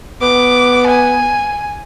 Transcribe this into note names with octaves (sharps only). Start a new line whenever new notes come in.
B3 D6
G#5